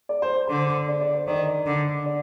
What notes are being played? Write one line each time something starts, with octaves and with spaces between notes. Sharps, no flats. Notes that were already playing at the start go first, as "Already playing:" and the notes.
D5
C5
D3 C5
D5
D5
C5
D#3 D5
D3
D5